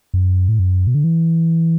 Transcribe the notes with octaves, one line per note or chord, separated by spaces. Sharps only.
F#2
A2
F#2
B2
D3
E3